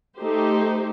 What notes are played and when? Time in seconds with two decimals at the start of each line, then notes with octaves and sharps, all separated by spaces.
0.19 A3 D#4 G4 C5